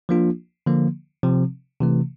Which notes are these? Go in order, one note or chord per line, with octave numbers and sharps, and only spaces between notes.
F3 A#3 D4 F4
D3 F3 A#3
C3 F3 C4
C3 E3 A3